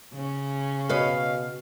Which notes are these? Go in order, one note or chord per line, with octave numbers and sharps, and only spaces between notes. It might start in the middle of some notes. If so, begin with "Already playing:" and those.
C#3 C#4
B2 B4 C#5 D#5 F5